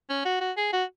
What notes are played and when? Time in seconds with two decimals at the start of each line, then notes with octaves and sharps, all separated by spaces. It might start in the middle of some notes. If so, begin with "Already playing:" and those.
0.10 C#4
0.25 F#4
0.41 F#4
0.57 G#4
0.73 F#4